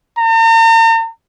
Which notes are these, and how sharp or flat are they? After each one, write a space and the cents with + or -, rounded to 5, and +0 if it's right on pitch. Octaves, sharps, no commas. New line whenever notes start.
A#5 -45